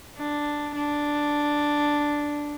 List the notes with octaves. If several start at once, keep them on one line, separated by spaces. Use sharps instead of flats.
D4
D4